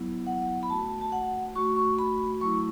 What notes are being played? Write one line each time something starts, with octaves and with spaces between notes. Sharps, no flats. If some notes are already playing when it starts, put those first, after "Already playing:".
Already playing: F#3 B3 E4
F#5
B5
A3 F#4 A5
A5
F#5
A3 F#4 C#6
C#6
B5
F#3 A3 E4 C#6